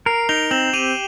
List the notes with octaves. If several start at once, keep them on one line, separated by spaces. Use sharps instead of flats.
A#4 C7 D7
D#4 F7 G7
C4 E7 F#7
G4 D#7 F7